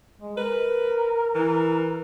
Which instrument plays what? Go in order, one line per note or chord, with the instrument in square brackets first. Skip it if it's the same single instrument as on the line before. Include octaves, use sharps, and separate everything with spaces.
[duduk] G#3
[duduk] A#4 [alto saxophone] B4
[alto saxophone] E3